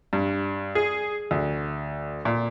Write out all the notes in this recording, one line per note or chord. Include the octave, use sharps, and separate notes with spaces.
G2
G#4
D2
A#2